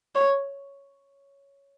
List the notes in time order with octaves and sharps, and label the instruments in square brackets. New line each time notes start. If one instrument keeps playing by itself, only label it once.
[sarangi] C#5